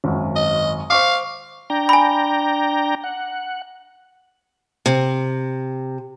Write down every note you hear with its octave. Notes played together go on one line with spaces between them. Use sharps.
G#1 F#2
D#5
C5 F5 C#6 D6
D4 G5 A#5
G#5 B5
F#5
C3